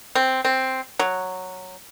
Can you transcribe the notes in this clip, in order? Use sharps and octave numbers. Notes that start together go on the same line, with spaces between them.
C4
C4
F#3